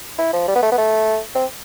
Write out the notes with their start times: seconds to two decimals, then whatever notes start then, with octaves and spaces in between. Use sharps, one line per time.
0.18 E4
0.33 F3
0.48 G3
0.55 B3
0.63 A3
0.72 B3
0.78 A3
1.35 C4